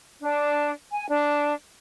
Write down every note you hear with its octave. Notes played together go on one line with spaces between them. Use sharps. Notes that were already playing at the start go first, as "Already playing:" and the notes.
D4
G#5
D4